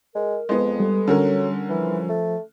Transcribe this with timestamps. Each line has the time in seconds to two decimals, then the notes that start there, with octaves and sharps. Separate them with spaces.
0.15 G#3 A#4
0.49 F2 G#3 B3
0.80 G3 A4
1.08 D3 F#3 C#4 A#4
1.69 E3 F3
2.09 A3